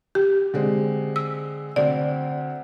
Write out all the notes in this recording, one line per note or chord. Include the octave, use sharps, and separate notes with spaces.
G4
D3 G#3 C4
E6
D2 C4 D5